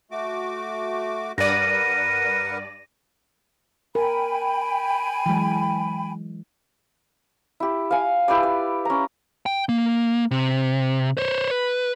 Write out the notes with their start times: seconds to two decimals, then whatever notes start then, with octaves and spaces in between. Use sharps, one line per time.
0.11 A3 F#4 D6
1.38 G2 A#4 B4 D5 F#5 A#6 D#7
3.95 A#4 G5 G#5 B5
5.26 E3 F#3 G#3
7.60 E4 G4
7.91 F5 G#5
8.28 E4 G4 B4 D5
8.43 D5
8.85 C#4 A#5
9.46 G5
9.69 A#3
10.31 C3
11.17 C5 C#5
11.51 B4